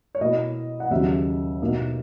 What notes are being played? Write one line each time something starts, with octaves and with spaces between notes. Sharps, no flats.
C#5
B2 A#3 E4 D#5
F#5
D#2 C#3 F#3 E5
B2 A#3 D#4